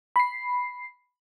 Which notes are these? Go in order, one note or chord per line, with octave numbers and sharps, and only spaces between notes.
B5 C7